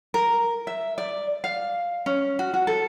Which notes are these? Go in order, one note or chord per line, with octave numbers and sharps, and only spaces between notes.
A#4
E5
D5
F5
C#4
F#4
F#4
A4